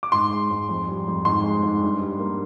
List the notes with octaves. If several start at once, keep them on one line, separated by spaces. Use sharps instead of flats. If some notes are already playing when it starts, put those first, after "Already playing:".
D6
G#2 C6
G#3
G#2
F2
G3
F2
G#2 C6
G#3
G#2
G2
G3
A#3